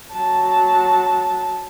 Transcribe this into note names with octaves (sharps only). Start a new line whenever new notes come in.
F#3 A5